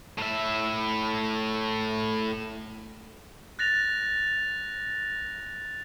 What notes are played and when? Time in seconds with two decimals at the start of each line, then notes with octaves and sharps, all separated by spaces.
0.18 A2 E5
3.59 F#6 A6 A#6 F7